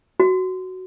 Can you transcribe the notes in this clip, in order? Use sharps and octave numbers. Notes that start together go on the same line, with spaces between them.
F#4